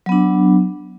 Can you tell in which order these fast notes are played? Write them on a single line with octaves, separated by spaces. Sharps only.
F#3 B3 D4